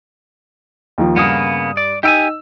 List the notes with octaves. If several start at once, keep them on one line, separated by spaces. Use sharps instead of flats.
D#2 D#3 F3
G2 C#3 A#3 B3 D#6
D5
D#4 G4 G5 G#5 E6